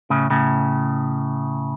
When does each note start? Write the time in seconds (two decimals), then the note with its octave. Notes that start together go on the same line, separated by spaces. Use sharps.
0.10 A2 C#3
0.30 A2 C#3